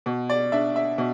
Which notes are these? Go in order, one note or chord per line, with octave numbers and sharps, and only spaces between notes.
B2
D5
D4 E5
E5
B2